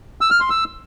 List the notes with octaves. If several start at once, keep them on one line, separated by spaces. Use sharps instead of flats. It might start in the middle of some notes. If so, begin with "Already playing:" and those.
E6
F6
C6
E6